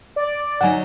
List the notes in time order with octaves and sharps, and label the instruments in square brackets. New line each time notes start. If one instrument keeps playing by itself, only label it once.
[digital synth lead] D5
[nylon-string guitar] D3 F#3 D#4 [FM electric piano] F#5 G#5